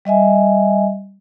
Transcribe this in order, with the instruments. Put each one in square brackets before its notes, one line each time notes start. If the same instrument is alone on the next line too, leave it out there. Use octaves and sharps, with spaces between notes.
[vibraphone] G3 D#5 E5 G#5